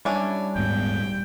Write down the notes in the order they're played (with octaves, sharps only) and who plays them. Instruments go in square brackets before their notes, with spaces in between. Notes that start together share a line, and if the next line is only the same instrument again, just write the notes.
[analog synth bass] G3 [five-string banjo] C#4 D4 E4
[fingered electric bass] D#1 G#2 B3 [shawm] G5